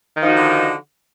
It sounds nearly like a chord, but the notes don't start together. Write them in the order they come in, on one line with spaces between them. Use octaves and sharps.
D#3 F3 D#4 F#4 D3